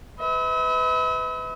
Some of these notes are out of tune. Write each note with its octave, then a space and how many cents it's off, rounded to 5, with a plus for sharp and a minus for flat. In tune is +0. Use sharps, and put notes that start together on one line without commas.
B4 +25 E5 -45